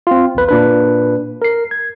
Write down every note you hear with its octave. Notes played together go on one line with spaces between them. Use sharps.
C4 F4
B1 E2 B4
A#2 D4 B4
A#4 C7
G#6